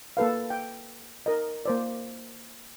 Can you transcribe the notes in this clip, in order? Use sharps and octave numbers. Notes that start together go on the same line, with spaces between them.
A#3 A4 B4 F5
G5
A#4 D#5
A#3 C5 D5